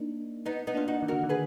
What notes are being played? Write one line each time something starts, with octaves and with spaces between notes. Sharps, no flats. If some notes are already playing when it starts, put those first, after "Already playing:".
Already playing: A#3 D4 D#4
B3 D#4
B3 D#4
A#3 D4 F4
D#4 F#4
D#3
D3 F#4 A#4
D#3
G#4 B4